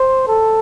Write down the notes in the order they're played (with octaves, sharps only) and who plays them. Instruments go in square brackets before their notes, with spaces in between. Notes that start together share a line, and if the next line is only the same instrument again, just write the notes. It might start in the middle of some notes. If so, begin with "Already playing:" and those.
Already playing: [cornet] C5
A4